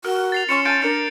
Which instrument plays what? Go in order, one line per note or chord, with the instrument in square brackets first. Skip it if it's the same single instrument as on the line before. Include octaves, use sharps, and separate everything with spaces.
[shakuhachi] F#4 [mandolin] A#4 [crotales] F6
[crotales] A6 C7 F7
[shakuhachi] C#4 [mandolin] F4 C6 C#6 [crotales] C#7 E7
[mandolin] F4 G#5 A5 [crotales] G6 A6 D7
[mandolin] D4 A#4 D6 [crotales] C#7